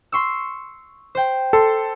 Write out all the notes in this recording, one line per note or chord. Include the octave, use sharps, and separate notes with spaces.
C6 C#6 E6
C5 G5
A4 C6